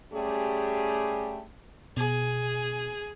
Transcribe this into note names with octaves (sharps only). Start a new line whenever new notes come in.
G3 A3 C#4 G4 G#4
B2 G#4